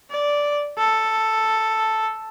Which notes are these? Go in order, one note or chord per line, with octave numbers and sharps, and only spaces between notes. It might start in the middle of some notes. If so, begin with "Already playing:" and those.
D5
A4